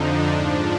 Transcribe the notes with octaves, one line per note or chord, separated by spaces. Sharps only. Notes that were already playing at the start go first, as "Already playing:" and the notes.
Already playing: F2 D3 F3 D4 D#4
G#2 F3